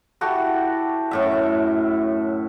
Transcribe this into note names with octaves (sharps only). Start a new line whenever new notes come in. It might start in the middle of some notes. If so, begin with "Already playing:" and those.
E4 F#4 G4 A4
F#2 A2 E5